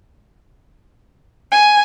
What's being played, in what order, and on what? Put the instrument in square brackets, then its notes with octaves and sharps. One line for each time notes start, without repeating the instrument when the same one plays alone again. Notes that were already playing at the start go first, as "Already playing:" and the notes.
[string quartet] G#5